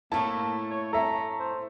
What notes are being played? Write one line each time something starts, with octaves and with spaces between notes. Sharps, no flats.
A2 A3 A#3 E4 A5
C#5
A4 E5 A#5
C5